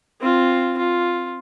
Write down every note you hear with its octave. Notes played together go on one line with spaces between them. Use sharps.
C4 F4
F4